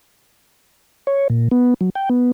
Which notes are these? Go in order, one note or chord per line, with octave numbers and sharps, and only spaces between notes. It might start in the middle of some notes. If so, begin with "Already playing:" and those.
C#5
A#2
B3
F#3
G5
B3